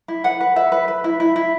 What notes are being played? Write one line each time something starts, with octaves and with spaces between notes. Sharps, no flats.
E4
B4 F#5
B4
B4 E5
B4
B4
E4
E4
E4